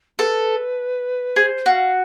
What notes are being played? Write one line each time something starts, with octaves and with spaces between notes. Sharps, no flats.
A4 B4
G#4 C5
F#4 F5